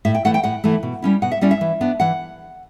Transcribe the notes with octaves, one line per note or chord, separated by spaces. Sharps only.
A2 E5
G5
E3 A3 F#5
G5
A2 F#5
E3 A3
B2
G3 C#4 E4
B2 F#5
E5
G3 C#4 E4 D5
E5
E3
B3 D4
E3 F#5